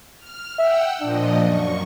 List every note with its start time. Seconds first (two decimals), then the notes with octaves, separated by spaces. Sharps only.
0.18 F6
0.59 E5 F#5 G5 E6
1.02 A#2 F3 D4 D#5
1.41 F#2 C#6